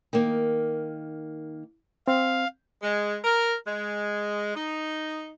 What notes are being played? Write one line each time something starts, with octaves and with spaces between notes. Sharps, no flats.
D#3 A#3
C4 F5
G#3
A#4
G#3
D#4